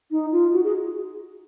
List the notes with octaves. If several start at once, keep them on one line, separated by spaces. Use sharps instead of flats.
D#4
F4
F#4
G#4